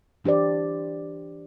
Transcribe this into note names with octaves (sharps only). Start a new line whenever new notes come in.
E3 D4 G4 C5 D5